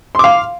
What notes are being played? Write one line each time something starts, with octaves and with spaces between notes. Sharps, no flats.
F5 C6 D6